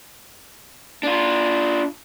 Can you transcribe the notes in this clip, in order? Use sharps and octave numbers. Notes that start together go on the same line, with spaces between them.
D4 F4